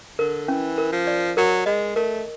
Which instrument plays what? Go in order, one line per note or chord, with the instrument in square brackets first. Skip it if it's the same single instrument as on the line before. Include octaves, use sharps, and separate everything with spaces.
[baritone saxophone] D3 [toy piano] A#4
[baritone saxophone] E3 [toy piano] C#4
[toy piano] A#4
[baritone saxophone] F3
[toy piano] D5
[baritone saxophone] F#3 [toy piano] A#4
[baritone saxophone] G#3 [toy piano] D#5
[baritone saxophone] A3 [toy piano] A#4